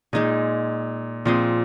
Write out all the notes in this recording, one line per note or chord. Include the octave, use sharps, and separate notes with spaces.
A#2 G#3 D#4 G#4
A#2 F3 C4 G#4 C5